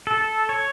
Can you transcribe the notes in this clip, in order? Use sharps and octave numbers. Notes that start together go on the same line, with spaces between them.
A4
C#5